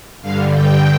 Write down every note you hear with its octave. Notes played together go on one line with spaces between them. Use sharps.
G2 D3 F5
G5